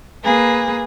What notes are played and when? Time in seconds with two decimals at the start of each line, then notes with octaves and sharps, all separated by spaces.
0.23 A#3 G#4 B4